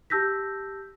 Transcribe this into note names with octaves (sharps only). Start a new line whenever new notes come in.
G4 A5 E6 G6 A#6 B6